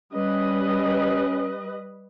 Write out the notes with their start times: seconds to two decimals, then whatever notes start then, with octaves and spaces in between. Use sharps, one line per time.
0.13 G3 C#4 B4 D#5